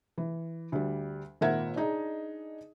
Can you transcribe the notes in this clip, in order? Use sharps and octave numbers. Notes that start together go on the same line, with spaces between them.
E3
D2 G3
G#1 A#2 A#4 E5 F#5 G#6
D4 D#4 G#4 D#5